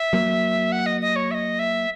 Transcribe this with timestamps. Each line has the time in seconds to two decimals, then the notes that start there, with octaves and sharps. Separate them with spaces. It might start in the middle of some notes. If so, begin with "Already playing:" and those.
Already playing: E5
0.13 F#3 A#3
0.72 F#5
0.86 D#5
1.01 D#5
1.16 C#5
1.31 E5
1.34 D#5
1.59 E5